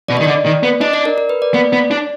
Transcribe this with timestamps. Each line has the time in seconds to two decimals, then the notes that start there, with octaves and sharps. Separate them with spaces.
0.08 B2 D5
0.17 D#5
0.20 D#3
0.24 D3 D5
0.46 D#3
0.63 B3
0.81 D4 D#5
0.93 D5
1.05 A#4
1.18 A#4
1.29 B4
1.42 D5
1.54 B3 D5
1.73 B3
1.91 D4